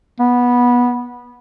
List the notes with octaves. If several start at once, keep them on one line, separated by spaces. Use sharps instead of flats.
B3